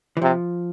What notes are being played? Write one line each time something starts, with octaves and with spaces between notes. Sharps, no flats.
E3
C3 F3